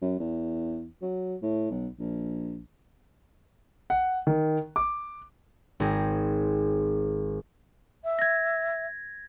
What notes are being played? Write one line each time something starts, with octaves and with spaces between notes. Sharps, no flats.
F#2
E2
F#3
A2
B1
A#1
F#5
D#3
D6
G#1 C4 G#4 A#6
E5
G#6 A#6